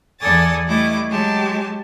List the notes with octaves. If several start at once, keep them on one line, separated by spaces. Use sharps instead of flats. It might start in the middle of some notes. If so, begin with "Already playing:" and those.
E2 A4 D5 G#5 D#6 A6
G3 A3 E4 D#5 D6
F#3 G#3 G4 G#5 A5